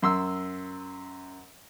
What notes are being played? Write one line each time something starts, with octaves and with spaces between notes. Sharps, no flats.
F#2 C6 E6